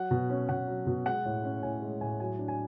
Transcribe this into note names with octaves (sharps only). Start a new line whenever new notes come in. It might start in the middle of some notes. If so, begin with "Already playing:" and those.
Already playing: F#3 F#5
B2
C#4
B2 F#5
F#3
B2
G#3 F#5
A2
C#4
A2 G#5
G#3
A2 G#5
F#3 G#5
D4
G#5